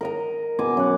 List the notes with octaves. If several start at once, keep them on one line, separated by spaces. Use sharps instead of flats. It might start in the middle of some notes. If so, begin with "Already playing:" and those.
A#4 D#5 A#5
B2 G#5 D6
F#2 F#5